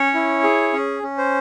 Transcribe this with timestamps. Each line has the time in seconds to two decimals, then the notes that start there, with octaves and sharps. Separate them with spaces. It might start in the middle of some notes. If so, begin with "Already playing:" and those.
Already playing: C#4 C#5
0.14 E4
0.44 G#4
0.73 C#4
1.03 C#4
1.18 C5